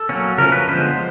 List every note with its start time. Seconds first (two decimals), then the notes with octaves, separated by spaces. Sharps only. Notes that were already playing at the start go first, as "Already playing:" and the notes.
Already playing: A4
0.09 F#3 A#3 C#4
0.38 C#3 F3 A3 C#4 A#4
0.52 B4
0.67 D3 F3 G#3 B3 C5